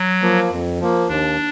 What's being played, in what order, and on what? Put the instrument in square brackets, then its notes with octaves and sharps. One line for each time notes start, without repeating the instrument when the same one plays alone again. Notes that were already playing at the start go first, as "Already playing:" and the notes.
Already playing: [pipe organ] F#3
[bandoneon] F3 A#3
F2
F3 A#3
[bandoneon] D#2 [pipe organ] D4